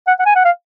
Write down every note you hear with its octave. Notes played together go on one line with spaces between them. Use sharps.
F#5
F#5
G#5
F#5
F5